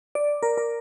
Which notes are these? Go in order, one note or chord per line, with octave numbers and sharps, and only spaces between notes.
D5
A#4
A#4